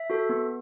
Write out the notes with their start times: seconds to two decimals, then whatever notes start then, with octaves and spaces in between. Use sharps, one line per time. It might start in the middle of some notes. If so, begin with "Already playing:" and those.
Already playing: E5
0.10 F#4 A4
0.29 B3